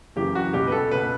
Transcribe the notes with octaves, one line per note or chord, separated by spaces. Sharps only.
F#2 C#3 E3 G4
F#4
C#2 B2 G4
B4
A4
C#2 B2 B4